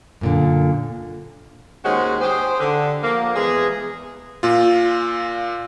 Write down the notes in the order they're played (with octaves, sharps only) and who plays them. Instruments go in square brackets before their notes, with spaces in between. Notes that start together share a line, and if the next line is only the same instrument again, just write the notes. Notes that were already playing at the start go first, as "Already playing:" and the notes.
[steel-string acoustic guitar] F#2 A#2 D3
[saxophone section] D#2 G#3 C#4 F#4 C5
G4 G#4 C5
D3
F3 A#3
E2 E3 G#3 G#4
[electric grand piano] A#2 F4